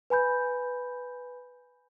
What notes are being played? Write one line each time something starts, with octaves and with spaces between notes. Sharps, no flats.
B4 G#5 B5 G6